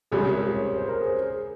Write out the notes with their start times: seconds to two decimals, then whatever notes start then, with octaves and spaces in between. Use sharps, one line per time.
0.11 C#2 C3 G3 C#4 G#4
0.29 A#4
0.47 C#5
0.63 C5
0.76 C5
0.89 A#4
1.01 G#4